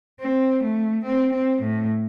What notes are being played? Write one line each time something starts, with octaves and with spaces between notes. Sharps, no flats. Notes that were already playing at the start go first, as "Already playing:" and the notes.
C4
A3
C4
C4
A2